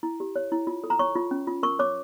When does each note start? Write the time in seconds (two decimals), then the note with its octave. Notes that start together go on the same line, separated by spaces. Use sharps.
0.03 E4
0.20 G4
0.36 C#5
0.52 E4
0.67 F4
0.84 A4
0.90 A#5
0.99 C#5 C#6
1.16 F4
1.31 C#4
1.47 F4
1.63 A#4 C#6
1.79 C#5 D6